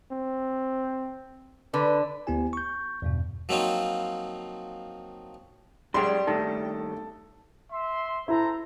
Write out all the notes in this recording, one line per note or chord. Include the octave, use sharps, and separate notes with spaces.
C4
D3 B4
D2 B3 E4 G4 G#5
C#6 G6
E2 G2 B2
F3 F#3 A#3 C4 D#4 F4
F#2 G3 G#3 C#5 G5 C6
G2 D#3 A3 A4
E5 C6
E4 A4 C5 A#5